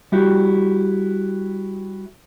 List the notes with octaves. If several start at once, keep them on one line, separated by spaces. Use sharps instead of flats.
G3 E4 F#4 G4